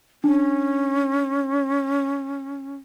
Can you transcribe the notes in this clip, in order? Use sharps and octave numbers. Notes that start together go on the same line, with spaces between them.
C#4 D4